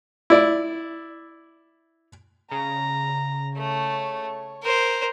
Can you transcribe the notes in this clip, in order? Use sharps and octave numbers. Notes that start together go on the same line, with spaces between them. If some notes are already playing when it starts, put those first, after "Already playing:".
E4 D5
C#3 A#5
A3 C#5
A#4 C5